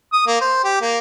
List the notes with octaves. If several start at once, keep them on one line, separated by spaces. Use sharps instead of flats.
D#6
A#3
C5
G4
A#3